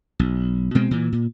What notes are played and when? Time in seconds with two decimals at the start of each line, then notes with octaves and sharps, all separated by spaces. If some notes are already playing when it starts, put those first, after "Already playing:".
0.19 B1
0.75 B2 G#3 C4
0.91 A#2 E3
1.13 A#2